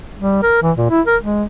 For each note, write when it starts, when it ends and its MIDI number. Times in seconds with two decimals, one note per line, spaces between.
0.19 0.41 55
0.43 0.62 70
0.62 0.72 52
0.77 0.89 46
0.91 1.01 64
1.07 1.17 70
1.23 1.44 56